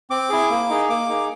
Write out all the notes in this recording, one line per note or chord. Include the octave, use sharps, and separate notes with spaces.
C4 D6
E4 G#4
A#3
D#4 G#4
A#3 D6
D#4 G#4